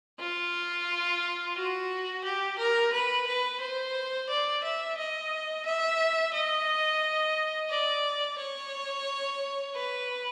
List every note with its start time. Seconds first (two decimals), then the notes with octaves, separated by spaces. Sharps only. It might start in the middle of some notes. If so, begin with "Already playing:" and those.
0.20 F4
1.56 F#4
2.24 G4
2.58 A#4
2.93 B4
3.27 B4
3.61 C5
4.29 D5
4.64 E5
4.98 D#5
5.66 E5
6.34 D#5
7.70 D5
8.39 C#5
9.75 B4